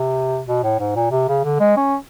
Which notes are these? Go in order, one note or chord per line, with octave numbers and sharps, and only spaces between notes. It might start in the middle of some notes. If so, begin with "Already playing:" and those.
Already playing: C3
B2
A2
G#2
A#2
C3
C#3
D3
G#3
C#4